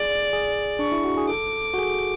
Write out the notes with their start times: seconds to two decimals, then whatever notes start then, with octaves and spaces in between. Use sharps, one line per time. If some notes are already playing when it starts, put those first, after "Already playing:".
Already playing: G#4 D5
0.33 G#4
0.79 D4 C#6
0.92 E4
1.05 F#4
1.17 G#4
1.29 A4 D6
1.74 F#4
1.78 G#4